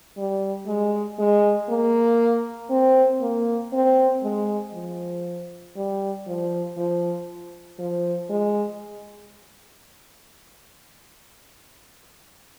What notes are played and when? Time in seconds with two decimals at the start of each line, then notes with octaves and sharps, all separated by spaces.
0.17 G3
0.67 G#3
1.19 G#3
1.69 A#3
2.70 C4
3.21 A#3
3.73 C4
4.23 G#3
4.73 F3
5.76 G3
6.27 F3
6.77 F3
7.79 F3
8.30 G#3